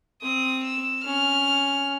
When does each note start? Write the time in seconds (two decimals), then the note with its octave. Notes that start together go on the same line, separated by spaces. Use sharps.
0.22 C4 D#6
0.64 E6
1.04 C#4 F6